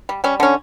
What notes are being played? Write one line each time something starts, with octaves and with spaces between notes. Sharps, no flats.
G3
G3 C#4
D3 C#4